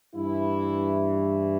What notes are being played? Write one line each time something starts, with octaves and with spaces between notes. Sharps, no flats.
G2 E3 E4